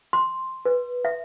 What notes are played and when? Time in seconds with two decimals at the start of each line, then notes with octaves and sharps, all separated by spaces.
0.13 C6
0.65 B4
1.05 E5